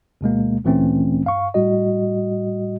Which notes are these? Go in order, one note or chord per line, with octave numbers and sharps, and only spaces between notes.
D2 B2 G#3 A#3
D2 A#2 E3 A3 C4 C#4
G2 F5 C#6
A2 G3 F#4 D#5